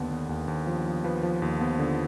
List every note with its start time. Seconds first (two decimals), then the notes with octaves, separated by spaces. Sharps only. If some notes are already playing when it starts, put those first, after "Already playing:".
Already playing: D#2 D3 B3
0.11 D#2
0.29 D#2
0.48 D#2
0.67 F3
0.86 F3
1.04 F3 B4
1.23 F3
1.42 D#2
1.61 B3
1.79 D3